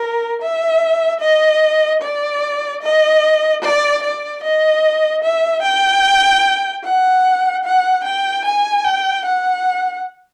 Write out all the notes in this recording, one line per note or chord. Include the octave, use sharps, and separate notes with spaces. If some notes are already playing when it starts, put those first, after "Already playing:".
Already playing: A#4
E5
D#5
D5
D#5
D5
D5
D#5
E5
G5
F#5
F#5
G5
G#5
G5
F#5